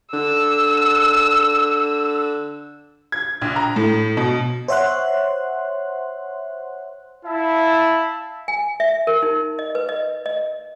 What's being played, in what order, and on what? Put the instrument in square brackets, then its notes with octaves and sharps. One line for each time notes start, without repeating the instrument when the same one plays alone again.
[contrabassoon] D3 [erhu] E6
[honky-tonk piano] G#6
A#1
A#5
A2
B2
[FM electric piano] C5 C#5 E5 F#5 C6 F#6
[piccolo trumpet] E4 [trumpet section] E5 F5 A5
[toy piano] G#5
E5
A#4
D#4
D#5
B4
D#5
D#5